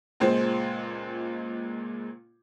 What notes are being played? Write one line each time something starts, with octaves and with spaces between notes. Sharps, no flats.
C#2 A#2 G#3 C5